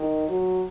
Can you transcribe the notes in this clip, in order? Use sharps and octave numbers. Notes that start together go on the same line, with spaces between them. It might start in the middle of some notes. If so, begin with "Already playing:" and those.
Already playing: D#3
F#3